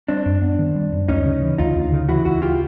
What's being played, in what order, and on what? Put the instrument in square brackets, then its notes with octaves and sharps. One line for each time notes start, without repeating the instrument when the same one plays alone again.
[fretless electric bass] G3 [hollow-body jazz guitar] C4 D4
[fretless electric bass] F#2
B3
D#3
G3
F#2
[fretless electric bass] D2 [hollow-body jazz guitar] C#4 D#4
[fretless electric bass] C#3
E3
[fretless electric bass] D2 [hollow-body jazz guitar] D#4 F4
[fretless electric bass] D2
C#3
[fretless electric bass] E3 [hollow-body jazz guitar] E4 F#4
[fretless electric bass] D2 [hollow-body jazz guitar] E4 F#4
[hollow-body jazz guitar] F4 G4